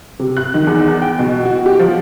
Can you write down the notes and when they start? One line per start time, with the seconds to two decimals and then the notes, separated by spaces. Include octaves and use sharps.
0.19 C3
0.37 F#6
0.54 D#3
0.67 E2
1.02 G5
1.19 B2
1.45 F#4
1.66 G4
1.79 F3